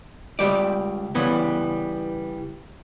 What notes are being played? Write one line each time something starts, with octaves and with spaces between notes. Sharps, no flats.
C#2 C#3 G3 D5
C#3 E3 G3 B3